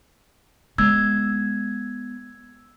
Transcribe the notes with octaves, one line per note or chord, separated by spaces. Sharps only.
G#3 B3 E6 G#6